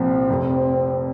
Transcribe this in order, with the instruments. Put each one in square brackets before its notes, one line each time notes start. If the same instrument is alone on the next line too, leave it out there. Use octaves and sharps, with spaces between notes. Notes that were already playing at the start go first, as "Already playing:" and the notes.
Already playing: [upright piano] C2 A#2 F3 [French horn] C4
[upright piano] F1 F2 C3